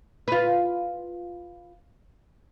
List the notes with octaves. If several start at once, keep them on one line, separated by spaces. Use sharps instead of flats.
F4 B4